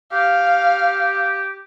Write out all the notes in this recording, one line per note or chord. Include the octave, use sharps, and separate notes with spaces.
G4 F5